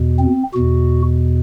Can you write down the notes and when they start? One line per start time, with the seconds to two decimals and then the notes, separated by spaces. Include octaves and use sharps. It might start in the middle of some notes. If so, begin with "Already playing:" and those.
Already playing: E2 B2
0.19 C4
0.54 E2 B2 F#4